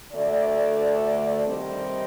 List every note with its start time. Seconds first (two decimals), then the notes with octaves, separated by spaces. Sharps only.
0.13 D2 D3 A3 D5
1.45 C3 D#3 G3 C4 D#5